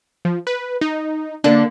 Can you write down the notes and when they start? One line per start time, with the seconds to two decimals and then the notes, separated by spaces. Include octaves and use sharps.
0.25 F3
0.47 B4
0.81 D#4
1.44 D3 A#3 D4